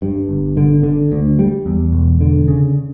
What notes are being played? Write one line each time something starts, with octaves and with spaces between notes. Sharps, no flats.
G2
G1
D3
D3
D2
G3
E2
E1
D3
C#3